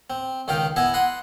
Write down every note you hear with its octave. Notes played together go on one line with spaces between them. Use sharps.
C4
C#2 D#3 D#4 F5 G5
B3 E4 D#5 E5 G#5
D#5 F#5 B5 C6 D#6